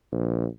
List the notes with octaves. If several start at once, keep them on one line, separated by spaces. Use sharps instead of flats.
A#1